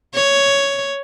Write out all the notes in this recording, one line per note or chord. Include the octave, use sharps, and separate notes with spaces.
C#5